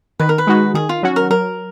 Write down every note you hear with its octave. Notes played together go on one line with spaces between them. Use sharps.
D#3 B4
A#4
B4
G#3 D#4 F#4
D#3 G#4
F4
F#3 C#4 F#4
A#4
F#3 A#4